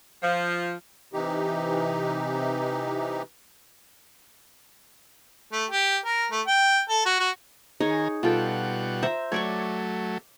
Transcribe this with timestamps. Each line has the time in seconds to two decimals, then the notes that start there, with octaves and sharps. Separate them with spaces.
0.23 F3
1.13 C3 E3 D#4 G4
5.52 A3
5.70 G4
6.05 A#4
6.31 A3
6.47 G5
6.89 A4
7.06 F#4
7.19 F#4
7.80 D#3 D#4 G#4 C#5 G#5 A#5
8.23 B2 G3 F4 A4 F#5 G5
9.03 C5 E5 A#5
9.32 F#3 A3 C#5 D5 C#6